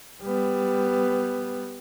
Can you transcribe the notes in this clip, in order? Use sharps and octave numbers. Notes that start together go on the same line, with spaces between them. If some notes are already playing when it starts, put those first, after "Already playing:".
G3 B3